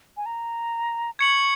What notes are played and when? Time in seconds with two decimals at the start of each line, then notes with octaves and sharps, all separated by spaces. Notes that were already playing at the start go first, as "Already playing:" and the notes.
0.17 G#5
0.26 A#5
1.19 C#6 G#6 C#7 F#7